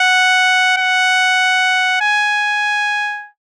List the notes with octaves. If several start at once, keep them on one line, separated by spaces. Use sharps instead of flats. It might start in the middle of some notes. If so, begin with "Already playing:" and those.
Already playing: F#5
F#5
G#5